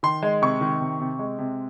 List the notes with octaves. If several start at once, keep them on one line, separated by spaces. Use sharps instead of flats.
D#3 C6
G#3
C3 C#6
D#3
C3
C3
G#3
C3